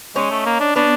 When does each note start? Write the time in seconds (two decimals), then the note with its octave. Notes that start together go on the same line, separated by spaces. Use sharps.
0.15 G#3 C#4 D#4
0.31 A3
0.46 A#3
0.60 D4
0.76 B3 C#4 D4